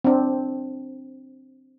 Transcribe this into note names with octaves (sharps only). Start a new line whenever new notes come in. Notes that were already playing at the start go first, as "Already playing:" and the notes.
C4 D4